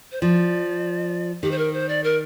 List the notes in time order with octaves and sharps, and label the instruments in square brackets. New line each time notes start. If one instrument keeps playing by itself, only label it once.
[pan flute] C5
[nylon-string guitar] F3 [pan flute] D5
[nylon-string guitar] D#3 [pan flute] G4
[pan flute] C5
A#4
C5
D5
A#4